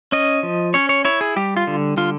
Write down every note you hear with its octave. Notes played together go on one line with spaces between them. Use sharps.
C#4 D#5
F3
C#4 C#5
C#5
E4 C#5
G#4
G3 G4
F4
D3
D3 F4